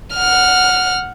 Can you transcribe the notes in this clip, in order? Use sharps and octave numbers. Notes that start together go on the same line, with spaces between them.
F#5 F6